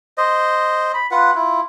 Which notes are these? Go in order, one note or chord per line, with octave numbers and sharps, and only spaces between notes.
C5 D#5
B5
F4 B4 F#5
E4 F4